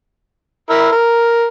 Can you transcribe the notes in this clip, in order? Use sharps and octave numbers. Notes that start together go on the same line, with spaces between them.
E4 A#4
A#4